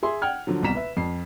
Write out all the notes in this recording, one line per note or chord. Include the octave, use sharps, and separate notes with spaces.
G#4 E5 C6
F#5 G5 F6 G#6
D3 F3 F#3
D#1 C2 B2 A#5 B6 E7
B4 E5
F2 C7